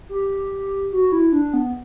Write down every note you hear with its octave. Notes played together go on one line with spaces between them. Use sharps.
G4
F#4
E4
D4
B3